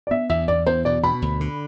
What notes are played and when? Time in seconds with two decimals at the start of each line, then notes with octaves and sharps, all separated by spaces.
0.07 D5
0.11 B3 E5
0.29 E2 E5
0.48 E2 D5
0.66 E2 C5
0.85 B2 D5
1.03 B2 B5
1.22 D2
1.41 D3